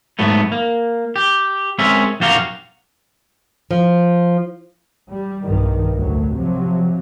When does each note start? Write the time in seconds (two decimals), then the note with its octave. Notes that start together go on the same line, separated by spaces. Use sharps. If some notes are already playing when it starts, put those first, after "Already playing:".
0.19 G#2 F#3 A3 B3
0.52 A#3
1.16 G4
1.79 G#3 C4 C#4 A#4 E5
2.20 B1 F#2 F#4 G4 F5 A#5
3.71 F3
5.11 G3
5.46 B1 G2 D#3
5.96 D2 A2 F#3
6.36 C3 F3 F#3